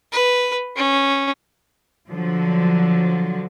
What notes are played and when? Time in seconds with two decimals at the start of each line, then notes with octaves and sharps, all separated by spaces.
0.12 B4
0.76 C#4
2.10 D3 F3 F#3